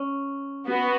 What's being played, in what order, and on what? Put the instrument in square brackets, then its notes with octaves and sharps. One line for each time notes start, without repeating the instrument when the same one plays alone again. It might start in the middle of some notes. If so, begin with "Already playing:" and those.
Already playing: [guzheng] C#4
[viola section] B3 F#4